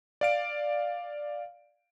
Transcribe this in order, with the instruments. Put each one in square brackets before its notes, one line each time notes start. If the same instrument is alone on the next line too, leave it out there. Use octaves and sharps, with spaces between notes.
[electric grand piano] D5 F5 D7